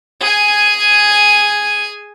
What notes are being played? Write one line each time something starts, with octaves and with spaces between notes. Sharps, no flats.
G#4 G#5